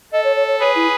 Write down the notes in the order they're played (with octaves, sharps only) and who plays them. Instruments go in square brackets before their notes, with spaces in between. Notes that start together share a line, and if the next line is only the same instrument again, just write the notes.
[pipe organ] A4 [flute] D#5
[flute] C#5
C#5
C#5
[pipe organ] G#4 B4 [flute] C#5
[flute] E4